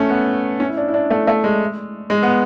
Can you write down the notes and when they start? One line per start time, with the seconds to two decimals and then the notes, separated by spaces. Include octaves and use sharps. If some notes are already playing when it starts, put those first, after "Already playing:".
Already playing: A3 C#4
0.10 B3
0.60 C#4
0.69 E4
0.77 D4
0.88 E4
0.94 D4
1.11 A3
1.27 A3
1.44 G#3
2.10 G#3
2.23 B3